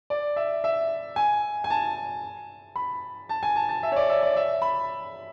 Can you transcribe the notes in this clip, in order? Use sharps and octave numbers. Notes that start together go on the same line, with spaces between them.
D5
E5
E5
G#5
G#5
A5
B5
A5
G#5
A5
A5
E5
C#5
D5
E5
D5
E5
B5